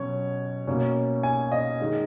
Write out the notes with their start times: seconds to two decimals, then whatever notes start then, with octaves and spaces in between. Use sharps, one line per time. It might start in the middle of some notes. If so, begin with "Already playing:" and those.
Already playing: B2 F#3 C#4 C#5
0.67 B2 A#3 C#4
1.23 G#5
1.52 D#5
1.81 D#3 G#3 D#4